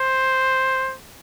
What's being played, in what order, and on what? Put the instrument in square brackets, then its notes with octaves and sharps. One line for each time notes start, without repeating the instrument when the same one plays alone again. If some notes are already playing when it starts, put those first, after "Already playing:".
Already playing: [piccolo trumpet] C5